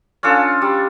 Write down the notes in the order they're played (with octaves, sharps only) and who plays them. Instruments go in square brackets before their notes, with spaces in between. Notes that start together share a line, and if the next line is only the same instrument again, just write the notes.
[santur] C#4 D4 F4 A4
G3